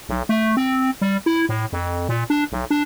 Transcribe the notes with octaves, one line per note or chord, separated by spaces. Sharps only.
B1
A3
C4
G3
E4
A2
F2
A#2
D4
B1
D4